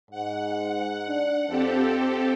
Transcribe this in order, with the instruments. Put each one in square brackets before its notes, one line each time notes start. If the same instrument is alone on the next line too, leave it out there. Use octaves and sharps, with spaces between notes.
[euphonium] G#2 [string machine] F#5
[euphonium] D4
[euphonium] F2 [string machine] C4 G4 A4